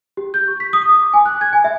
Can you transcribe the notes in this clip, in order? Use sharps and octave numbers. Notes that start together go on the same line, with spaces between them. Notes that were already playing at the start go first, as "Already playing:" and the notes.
G4
G6
C#6
B6
D#6
D6
G#5
F#6
G#6
G#5
E5